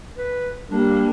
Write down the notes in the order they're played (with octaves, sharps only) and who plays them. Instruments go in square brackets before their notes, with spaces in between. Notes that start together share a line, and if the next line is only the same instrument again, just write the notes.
[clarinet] B4
[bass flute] G3 [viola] A#3 [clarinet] D4